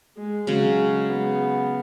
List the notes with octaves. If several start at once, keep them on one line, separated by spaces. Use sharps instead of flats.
G#3
C#3 F#3 G#3 C#4
B3